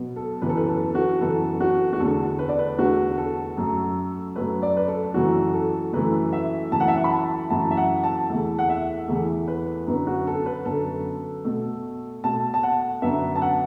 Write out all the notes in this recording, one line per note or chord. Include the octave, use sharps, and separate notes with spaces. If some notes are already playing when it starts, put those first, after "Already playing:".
Already playing: B2 F#3 B3
A4
F#2 E3 B3 B4
A4
B4
A4
A4
F#4
F#2 E3 B3 A4
F#4
F#4
E2 D3 A3 A4
B4
D5
B4
E2 D3 A3 F#4
A4
F#2 F#3 A3
F#2 F#3 A3 B4
D5
B4
A4
F#2 E3 A3 F#4
A4
F#2 E3 A3 B4
E5
F#2 E3 A3 A5
F#5
E5
F#5
B5
A5
F#2 E3 A3 A5
E5
F#5
A5
E2 E3 A3
F#5
E5
E2 E3 A3
B4
F#2 D3 B3
F#4
A4
B4
F#2 D3 B3 A4
B2 A3
B2 A3 A5
A5
F#5
F#2 D3 B3 E5
A5
F#5